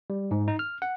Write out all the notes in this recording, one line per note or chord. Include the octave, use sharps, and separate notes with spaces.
G3
G#2
D#4
F6
F#5